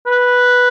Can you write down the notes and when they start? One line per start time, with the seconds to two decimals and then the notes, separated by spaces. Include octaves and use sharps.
0.07 B4